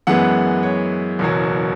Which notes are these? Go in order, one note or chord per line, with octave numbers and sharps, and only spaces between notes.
F#2 E3 G#3 B3 F#5
C#5
F#1 E2 B2 F#3